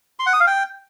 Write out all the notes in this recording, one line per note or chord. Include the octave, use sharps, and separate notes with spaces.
C6
F#5
D#6
F5
G5